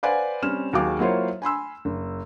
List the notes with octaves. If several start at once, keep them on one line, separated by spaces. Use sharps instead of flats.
B4 C5 D5 F5 F#5 G#5
G3 C4 C#4 F6 E7
D#2 F#3 F#4 G#4 F5 D6
F#3 A#3 E4 F4 C5 C#5
G#5 B5 C6 E6
F#1